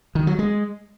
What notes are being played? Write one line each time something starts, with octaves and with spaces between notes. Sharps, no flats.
D#3
F#3
G#3